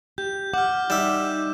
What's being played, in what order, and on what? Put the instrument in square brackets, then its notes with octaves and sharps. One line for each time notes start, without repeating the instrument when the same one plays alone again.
[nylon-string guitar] G4 [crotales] G6
[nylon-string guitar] F#5 [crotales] D6 F6
[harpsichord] G3 E5 [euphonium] D#4 [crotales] E7